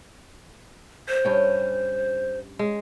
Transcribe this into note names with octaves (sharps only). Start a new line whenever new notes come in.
C5
G2 C#4 G5
G#3